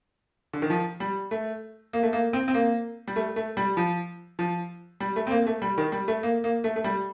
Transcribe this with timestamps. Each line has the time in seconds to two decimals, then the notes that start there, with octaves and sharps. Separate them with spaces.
0.53 D3
0.62 D#3
0.70 F3
1.00 G3
1.31 A3
1.93 A#3
2.03 A3
2.13 A#3
2.33 C4
2.48 C4
2.54 A#3
3.07 G3
3.16 A3
3.36 A3
3.57 G3
3.77 F3
4.39 F3
5.00 G3
5.16 A3
5.27 C4
5.31 A#3
5.47 A3
5.62 G3
5.78 D#3
5.92 G3
6.08 A3
6.23 A#3
6.44 A#3
6.64 A3
6.76 A3
6.84 G3